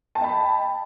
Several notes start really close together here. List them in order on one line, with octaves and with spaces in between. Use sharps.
A5 G5 D#5 B5